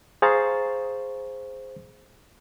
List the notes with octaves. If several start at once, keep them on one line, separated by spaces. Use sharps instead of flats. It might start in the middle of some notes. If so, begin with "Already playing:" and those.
G#4 C5 F5 A#5 C#6 A6